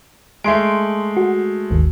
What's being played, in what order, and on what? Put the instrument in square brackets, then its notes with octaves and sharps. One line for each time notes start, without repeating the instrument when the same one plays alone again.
[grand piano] G#3 A3 [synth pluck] C6 D7
[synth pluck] F#4
G#1 D#2